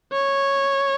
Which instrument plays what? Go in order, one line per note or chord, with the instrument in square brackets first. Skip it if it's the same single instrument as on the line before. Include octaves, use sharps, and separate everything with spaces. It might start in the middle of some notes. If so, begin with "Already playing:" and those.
[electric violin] C#5